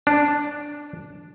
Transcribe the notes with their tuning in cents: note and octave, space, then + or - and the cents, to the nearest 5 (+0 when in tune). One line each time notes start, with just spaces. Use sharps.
D4 -5